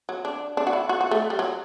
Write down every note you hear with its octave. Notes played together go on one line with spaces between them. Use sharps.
F#3
D4
D4
F#4
E4
F#4
F#4
A3
G3
F#3